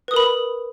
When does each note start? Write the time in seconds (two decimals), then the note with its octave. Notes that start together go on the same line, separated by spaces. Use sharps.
0.08 B4
0.11 D#6
0.14 A#4
0.16 B5